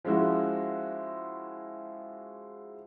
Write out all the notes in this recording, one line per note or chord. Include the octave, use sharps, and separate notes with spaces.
F3 G#3 C#4 E4 F#4